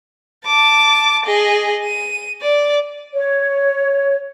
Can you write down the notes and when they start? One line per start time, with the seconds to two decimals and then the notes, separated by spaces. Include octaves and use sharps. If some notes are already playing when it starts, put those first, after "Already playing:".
0.46 A5 D6
1.25 G#4 D#5
1.84 D#7
2.42 D5
3.13 C#5